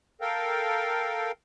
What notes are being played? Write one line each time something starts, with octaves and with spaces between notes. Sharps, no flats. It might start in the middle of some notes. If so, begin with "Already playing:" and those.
A4 A#4 F5 G5